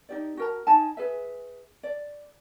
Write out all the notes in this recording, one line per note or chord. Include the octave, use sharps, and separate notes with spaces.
D#4 G4 D5
F#4 A#4 A#5
D#4 G#5 A5
G#4 B4 E5
D5